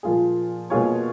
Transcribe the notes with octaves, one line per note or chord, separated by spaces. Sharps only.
A#2 F3 A#3 F4 G#4
B2 A#3 F4 G#4 C#5